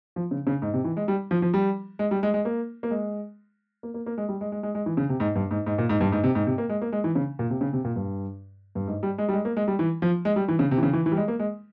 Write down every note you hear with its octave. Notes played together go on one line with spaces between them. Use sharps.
F3
C#3
C#3
G#2
C3
E3
G#3
G3
F3
F3
G3
G#3
G3
G#3
G#3
A#3
A#3
G#3
A#3
A#3
A#3
G#3
G3
G#3
G#3
G#3
G#3
E3
C#3
C3
G#2
G2
G#2
G#2
A#2
G#2
G2
G#2
C3
G#2
C3
A#3
G#3
A#3
G#3
E3
C#3
A#2
C3
C#3
C3
A#2
G2
G2
G#2
G3
G#3
G3
G#3
A#3
G#3
G3
E3
F3
G#3
G3
E3
C#3
C3
E3
C#3
E3
E3
G3
G#3
A#3
G#3